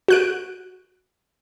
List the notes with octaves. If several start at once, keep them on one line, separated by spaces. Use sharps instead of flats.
F#4 F#6 D7